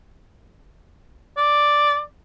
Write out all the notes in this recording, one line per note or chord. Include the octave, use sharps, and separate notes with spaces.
D5